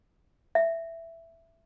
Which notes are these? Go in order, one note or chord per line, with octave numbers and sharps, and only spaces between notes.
E5